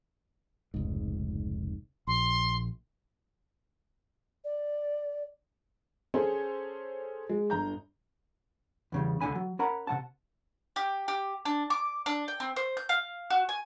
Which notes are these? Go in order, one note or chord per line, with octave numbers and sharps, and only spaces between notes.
F1 C#2 G#2
A#1 C6
D5
C#4 G#4 A4 C5 C#5
G#3
G1 A#5 G6
E2 C#3 G3
C#2 D3 D4 G#5 B5
F#3
C#4 A#4 F#5 A#5 B5
C3 A3 F#5 A5
G4
G4
D4
D6
D4
G5
C4
C5
G6
F5
F#4
G#5